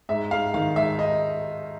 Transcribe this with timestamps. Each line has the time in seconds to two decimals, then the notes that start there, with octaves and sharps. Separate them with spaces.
0.09 G#2 E5
0.31 G#2 F5
0.54 D#3 F5
0.76 G#2 E5
0.99 D#5